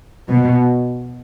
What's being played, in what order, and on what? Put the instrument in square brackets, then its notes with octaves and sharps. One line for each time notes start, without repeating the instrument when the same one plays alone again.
[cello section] B2